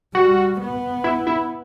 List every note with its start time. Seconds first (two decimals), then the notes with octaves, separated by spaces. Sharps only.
0.15 G3 F#4
0.60 B3
1.04 E4
1.27 E4